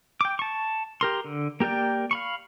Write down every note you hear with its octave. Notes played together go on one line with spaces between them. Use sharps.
G5 D6
A5 C#6
G4 A#4 C6
D3
A#3 G4 A#4 D5 G5
F5 B5 C#6